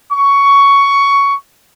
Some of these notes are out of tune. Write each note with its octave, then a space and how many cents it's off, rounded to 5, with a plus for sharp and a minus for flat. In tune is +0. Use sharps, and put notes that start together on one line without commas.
C#6 +10